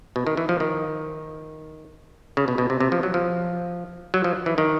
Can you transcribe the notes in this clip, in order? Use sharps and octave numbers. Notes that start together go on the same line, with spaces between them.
B2
D#3
E3
F3
D#3
C#3
B2
B2
C3
C3
F3
F#3
F3
F#3
F3
E3
D#3